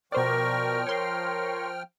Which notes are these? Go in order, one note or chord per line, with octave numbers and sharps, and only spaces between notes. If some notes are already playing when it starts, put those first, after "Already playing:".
B2 F3 A#4 C5 D5 G5 C#6 F6
A#4 C#5 C6 C#6